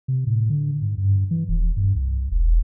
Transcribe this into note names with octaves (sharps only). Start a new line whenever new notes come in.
C3
A2
D3
G#2
G2
E3
D#1
G2
C2
E1